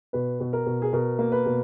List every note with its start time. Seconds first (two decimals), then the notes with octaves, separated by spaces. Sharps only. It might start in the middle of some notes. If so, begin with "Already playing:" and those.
0.13 B2 B4
0.40 B2
0.53 A#4
0.66 B2
0.82 G#4
0.93 B2 A#4
1.19 A#3
1.32 B4
1.46 B2